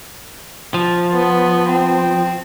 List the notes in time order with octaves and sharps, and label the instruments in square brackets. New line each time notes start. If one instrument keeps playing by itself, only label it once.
[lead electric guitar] F3
[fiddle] B3
C4